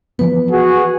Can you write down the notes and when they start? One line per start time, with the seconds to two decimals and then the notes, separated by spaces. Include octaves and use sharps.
0.19 E3 F3 B3 B4
0.52 F#4 G#4